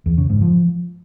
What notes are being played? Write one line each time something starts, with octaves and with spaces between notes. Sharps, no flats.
E2
C#3
G#2
F3